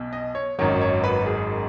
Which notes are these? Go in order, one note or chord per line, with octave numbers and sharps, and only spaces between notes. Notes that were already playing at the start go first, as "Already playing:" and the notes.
Already playing: B1 B2
D#5
C#5
G#1 F#2 D#3 F#3 C#5
C#5
B4
G#4